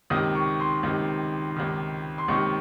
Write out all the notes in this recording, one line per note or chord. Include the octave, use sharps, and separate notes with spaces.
C#2 C3 D#3 D#6
C#6
C6
C#2 C3 D#3
C#2 C3 D#3
C6
C#2 C3 D#3 C#6